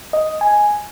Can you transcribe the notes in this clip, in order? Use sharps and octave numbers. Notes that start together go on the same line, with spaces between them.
D#5
G#5